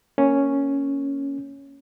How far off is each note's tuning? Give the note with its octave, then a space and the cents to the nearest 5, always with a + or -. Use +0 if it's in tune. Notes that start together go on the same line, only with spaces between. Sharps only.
A#3 +0 C#4 +0